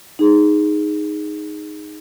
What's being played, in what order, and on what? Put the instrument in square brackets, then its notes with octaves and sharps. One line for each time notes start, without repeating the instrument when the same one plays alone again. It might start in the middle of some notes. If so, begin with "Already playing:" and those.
[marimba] D#4 G#4